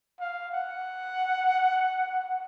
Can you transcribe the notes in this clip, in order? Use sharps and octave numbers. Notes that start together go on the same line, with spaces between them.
F5
F#5